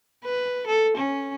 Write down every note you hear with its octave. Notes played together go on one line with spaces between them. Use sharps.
B4
A4
C#4